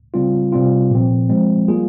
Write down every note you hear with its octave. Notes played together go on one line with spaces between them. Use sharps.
C#3 G3 C4 F4
C3 G3 C4 F4
A#2 F3 C4
F3 G#3 C4
G3 A#3 F4 G#4